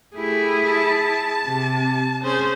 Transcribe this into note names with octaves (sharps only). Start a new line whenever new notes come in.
A3 E4 G4 G#4
A5
C3
C#4 G#4 C5